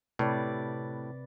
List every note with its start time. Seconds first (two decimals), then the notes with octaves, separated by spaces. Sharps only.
0.19 A2 C3 B4 D5